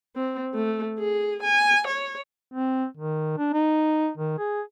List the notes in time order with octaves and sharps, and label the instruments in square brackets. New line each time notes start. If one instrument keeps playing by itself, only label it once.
[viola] C4
A3
G#4
G#5
C#5
[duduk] C4
D#3
D4
D#4
D#3
G#4